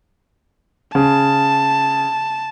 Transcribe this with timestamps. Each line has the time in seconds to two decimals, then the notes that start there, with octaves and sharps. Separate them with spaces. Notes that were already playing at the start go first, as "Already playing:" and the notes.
0.95 C#3 A5